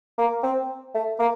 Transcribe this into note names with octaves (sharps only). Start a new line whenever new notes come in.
A#3
C4
A3
A#3